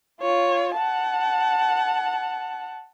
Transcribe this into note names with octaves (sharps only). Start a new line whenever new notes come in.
F4 C#5
F#5 A5